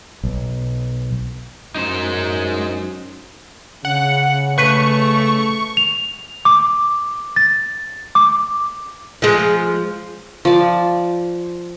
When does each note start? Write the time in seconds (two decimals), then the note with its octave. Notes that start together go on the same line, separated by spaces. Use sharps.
0.24 B1
1.75 F#2 D#4 C5
3.85 C#3 F#5
4.58 A3 B4 C#6
5.77 F7
6.45 D6
7.36 A6
8.15 D6
9.22 F3 G#3
10.45 F3 D5